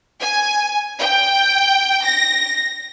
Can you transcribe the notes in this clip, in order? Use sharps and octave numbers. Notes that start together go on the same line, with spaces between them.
G#5
G5
A#6